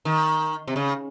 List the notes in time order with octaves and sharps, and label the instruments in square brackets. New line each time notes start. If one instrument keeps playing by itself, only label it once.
[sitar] D#3
C3
C#3